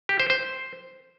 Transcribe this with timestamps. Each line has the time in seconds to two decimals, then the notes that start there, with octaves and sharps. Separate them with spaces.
0.09 G4
0.20 C5
0.30 C5